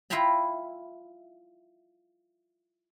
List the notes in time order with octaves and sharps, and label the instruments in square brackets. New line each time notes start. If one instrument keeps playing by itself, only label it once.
[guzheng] E4 F4 E5 G5 A#5 B5